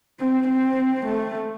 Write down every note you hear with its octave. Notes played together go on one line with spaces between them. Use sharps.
C4
C4
A3